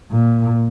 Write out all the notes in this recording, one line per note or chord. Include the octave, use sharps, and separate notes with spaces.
A#2